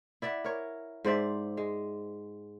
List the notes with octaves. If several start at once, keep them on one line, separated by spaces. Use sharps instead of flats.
E4 D5 E5 F#5
A#4 C#5
G#2 C5 D5 E5
G#3